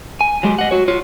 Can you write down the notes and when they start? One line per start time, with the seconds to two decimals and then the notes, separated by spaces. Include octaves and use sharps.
0.21 G#5
0.43 F#3 G#3 G4
0.58 D#5 F#5
0.71 F#4 C#5
0.88 F4 C#5